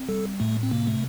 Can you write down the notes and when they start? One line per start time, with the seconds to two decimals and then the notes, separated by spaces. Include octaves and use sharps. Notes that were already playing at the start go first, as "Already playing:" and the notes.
Already playing: C4
0.08 G3 A4
0.40 A2 A3
0.63 C4
0.71 C3 A#3
0.87 A3